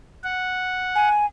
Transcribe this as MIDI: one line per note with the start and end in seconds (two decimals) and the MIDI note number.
0.24 1.09 78
0.95 1.26 80